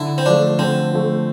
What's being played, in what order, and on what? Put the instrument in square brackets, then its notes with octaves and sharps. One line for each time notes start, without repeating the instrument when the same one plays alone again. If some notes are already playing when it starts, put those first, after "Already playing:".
Already playing: [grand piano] D3 [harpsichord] E4
[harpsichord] C4
[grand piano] F3 A3 [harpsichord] D4
[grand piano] D3 [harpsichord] C4
[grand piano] F3 A3